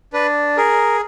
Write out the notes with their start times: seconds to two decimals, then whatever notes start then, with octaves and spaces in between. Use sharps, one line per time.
0.13 D4 B4
0.57 G#4 A#4